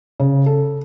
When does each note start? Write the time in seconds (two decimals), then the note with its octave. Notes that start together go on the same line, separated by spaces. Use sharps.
0.20 C#3
0.46 A4